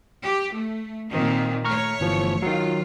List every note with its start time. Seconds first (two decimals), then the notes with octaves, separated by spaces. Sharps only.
0.23 G4
0.55 A3
1.11 A#2 D#3 C4
1.65 A3 C#5 A#5 C#6 F6
2.00 G1 E3 F3
2.42 D#3 F#3 F4